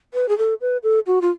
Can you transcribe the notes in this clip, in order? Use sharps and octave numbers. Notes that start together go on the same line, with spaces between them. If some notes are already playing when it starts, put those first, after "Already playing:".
B4
G#4
A4
B4
A4
F#4
F4